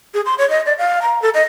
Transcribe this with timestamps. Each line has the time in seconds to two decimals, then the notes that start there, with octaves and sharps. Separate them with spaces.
0.14 G#4
0.26 C6
0.38 C#5
0.50 D#5
0.66 D5
0.78 F5
1.02 A#5
1.22 A4
1.34 D#5